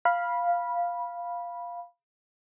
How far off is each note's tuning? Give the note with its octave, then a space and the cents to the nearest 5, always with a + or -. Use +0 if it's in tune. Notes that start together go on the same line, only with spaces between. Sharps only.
F5 +0 B5 -15